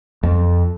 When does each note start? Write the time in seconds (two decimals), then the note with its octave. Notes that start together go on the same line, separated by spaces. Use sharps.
0.23 F2